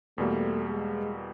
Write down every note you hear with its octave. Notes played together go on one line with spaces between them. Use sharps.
E2 B2 G3 A3 A#3
G#3